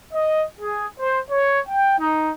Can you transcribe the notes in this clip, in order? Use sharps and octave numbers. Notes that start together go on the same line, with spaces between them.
D#5
G#4
C5
C#5
G5
D#4